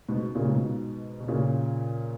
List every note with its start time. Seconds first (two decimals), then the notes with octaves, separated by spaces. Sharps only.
0.09 G#2 B2
0.35 A#2 C#3
0.49 G#2 B2
1.20 B2
1.28 A#2 C#3